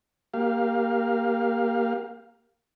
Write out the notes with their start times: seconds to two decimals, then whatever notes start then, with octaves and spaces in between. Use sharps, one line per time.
0.34 A#3 G4 F5